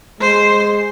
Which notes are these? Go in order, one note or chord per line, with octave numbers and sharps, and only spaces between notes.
G#3 C5